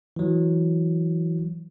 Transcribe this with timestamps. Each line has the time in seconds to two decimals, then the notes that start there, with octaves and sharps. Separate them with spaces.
0.16 E3 F#3